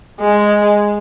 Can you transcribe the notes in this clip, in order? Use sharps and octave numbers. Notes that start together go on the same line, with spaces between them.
G#3